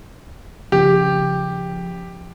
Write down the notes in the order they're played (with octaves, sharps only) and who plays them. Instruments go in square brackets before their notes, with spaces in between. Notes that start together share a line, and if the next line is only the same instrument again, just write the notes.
[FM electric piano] C#3 F3 [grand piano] G4